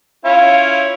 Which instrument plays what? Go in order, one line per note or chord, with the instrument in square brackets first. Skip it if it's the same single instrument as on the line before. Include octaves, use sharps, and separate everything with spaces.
[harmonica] C#4 E4 F4 [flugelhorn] F5